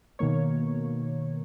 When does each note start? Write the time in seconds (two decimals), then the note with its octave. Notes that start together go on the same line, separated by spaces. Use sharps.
0.19 B2 D#3 A#3 C#5